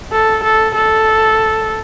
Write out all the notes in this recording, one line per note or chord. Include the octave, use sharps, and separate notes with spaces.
A4
A4
A4